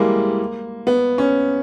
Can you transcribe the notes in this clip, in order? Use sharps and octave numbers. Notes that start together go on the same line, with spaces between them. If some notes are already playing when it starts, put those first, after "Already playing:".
Already playing: E3 G3 G#3 A#3
B3
C#4